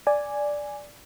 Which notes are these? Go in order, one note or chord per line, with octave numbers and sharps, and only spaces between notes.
D5 G#5